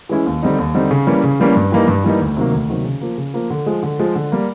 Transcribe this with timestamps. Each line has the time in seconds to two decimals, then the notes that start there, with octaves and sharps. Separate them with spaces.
0.09 E3 G#3 C#4 E4
0.26 D#2
0.43 D3 G3 C4 D#4
0.59 D#2
0.74 D3 G3 C4 D#4
0.91 C#3
1.07 E3 G3 A#3 C#4
1.24 C#3
1.40 E3 G3 A#3 C#4
1.56 G2
1.72 E3 G3 A#3 D#4
1.88 G2
2.04 E3 G3 A#3 D#4
2.21 D2
2.37 C3 D#3 F#3 A#3
2.53 D2
2.69 C3 D#3 F#3 A#3
2.85 C#3
3.01 F3 A#3
3.17 C#3
3.34 F3 A#3
3.50 D3
3.66 F3 G#3
3.83 D3
3.99 F3 G#3
4.15 D3
4.32 G3 A#3